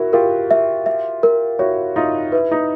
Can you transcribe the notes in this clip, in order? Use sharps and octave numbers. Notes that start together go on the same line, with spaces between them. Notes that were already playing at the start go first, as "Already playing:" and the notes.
Already playing: E4 F#4 A#4
F4 G4 A#4
E5
E5
A#4
E4 F#4 C#5
D#4 F4 E5
E4 B4
D#4